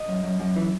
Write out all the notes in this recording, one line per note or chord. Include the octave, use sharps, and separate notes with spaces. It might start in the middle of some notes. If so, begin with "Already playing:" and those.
Already playing: D#5
F#2
F#2
F#2
E3